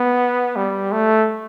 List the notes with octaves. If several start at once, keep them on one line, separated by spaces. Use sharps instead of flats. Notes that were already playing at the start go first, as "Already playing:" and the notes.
Already playing: B3
G3
A3